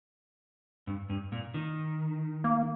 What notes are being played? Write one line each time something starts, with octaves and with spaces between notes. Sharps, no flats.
G2
G2
A#2
D#3
A#3